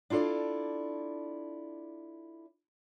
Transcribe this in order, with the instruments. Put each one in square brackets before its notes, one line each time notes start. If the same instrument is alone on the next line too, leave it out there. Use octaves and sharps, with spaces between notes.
[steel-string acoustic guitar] D4 E4 F4 A4 D5